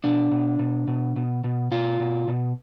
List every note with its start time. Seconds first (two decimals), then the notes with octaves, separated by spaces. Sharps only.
0.04 B2 D4
0.31 B2
0.59 B2
0.88 B2
1.16 B2
1.44 B2
1.71 B2 F4
2.00 B2
2.28 B2